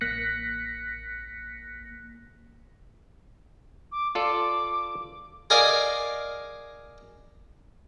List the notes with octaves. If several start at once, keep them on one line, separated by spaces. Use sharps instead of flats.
A1 A#3 F#6 A#6 B6 C#7
D6
F4 A4 D5 D6
G#4 A#4 D5 D#5 F5 G#5